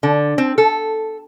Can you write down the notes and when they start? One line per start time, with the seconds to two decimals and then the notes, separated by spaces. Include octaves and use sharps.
0.03 D3
0.38 C4
0.58 A4